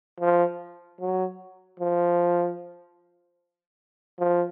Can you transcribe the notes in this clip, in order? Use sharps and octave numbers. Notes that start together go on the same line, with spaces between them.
F3
F#3
F3
F3